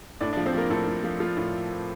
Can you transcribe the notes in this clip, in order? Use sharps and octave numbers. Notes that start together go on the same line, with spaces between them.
A2 D4 D5
D4 D5
F3
C4 C5
F3 A#3 A#4
A2 A3 A4
A2
F3
F3 F4
A2